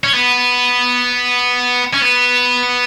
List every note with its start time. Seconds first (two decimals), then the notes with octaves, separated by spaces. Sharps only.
0.04 C#4
0.14 B3
1.93 C#4
2.01 B3